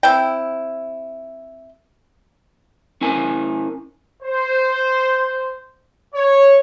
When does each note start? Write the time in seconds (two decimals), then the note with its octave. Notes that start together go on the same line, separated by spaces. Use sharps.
0.03 C4 E4 G5
3.01 C#4 E4 A#4 G#5
4.23 C5
6.15 C#5